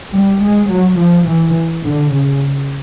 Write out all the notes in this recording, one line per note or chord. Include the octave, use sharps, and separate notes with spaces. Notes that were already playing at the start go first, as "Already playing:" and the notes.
G3
G#3
F#3
F3
E3
D3
C#3